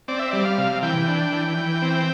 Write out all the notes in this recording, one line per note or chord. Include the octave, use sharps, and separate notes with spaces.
C4 D5
E5
G3 D5
F5
C3
E3 G5
D4
E3
E3
C4